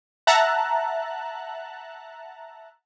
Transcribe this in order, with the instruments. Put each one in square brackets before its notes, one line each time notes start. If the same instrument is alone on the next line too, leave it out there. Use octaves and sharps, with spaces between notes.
[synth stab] E5 F#5 A5 A#5 F#6